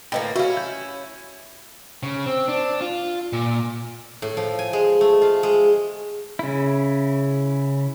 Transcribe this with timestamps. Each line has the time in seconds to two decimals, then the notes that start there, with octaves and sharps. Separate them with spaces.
0.12 A2 D3 A#3 B4 D#5 G5
0.36 C#4 E4 F#4 F5
0.57 G6
2.03 C#3
2.26 C4
2.48 D4
2.81 F4
3.33 A#2
4.22 A2
4.37 F3
4.59 G#5
4.73 G#3
5.01 A3
5.22 F4
5.43 G#3
6.39 C#3 E4